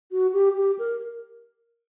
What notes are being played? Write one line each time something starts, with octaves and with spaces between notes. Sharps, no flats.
F#4
G4
G4
A#4